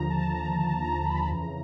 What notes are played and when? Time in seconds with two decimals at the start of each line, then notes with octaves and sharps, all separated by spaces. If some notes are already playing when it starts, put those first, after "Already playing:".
Already playing: D#2 D3 F3 A#5
0.10 A5
0.34 A#5
0.58 A5
0.82 A#5
1.05 B5
1.28 F2 C#3 E3 A#5